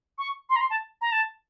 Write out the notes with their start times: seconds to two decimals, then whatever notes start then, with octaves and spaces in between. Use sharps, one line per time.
0.18 C#6
0.50 C6
0.56 A#5
0.61 C6
0.70 A5
1.01 A#5
1.12 A5